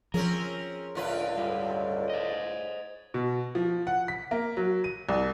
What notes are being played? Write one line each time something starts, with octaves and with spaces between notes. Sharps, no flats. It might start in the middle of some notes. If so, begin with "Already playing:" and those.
F3 C4 C#4 G#4 A#4
C#2 A2 D3 F4 B4
G2
C5 D#5
B2
F3
F#5
B6
A#3
F#3
D#7
C2